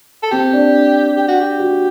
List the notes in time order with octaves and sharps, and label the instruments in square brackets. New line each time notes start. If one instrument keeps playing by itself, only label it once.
[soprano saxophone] A4
[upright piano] C4 [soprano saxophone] G4
[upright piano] D4
[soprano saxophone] G4
F#4
G4
[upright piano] F#4